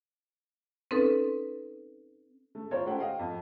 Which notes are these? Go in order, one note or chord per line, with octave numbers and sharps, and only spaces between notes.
C4 C#4 D#4 A4 B4
A3
F4 A#4 C5 C#5
A3 C#4 G4 C5 F#5 G5
D#5 F5 G5
F2